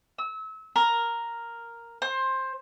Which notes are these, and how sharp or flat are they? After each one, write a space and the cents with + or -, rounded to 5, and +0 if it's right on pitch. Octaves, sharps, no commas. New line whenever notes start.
E6 -30
A#4 +0
C5 +15